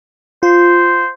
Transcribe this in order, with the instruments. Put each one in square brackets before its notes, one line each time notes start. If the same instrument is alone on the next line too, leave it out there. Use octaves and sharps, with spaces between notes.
[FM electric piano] F4 [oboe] C5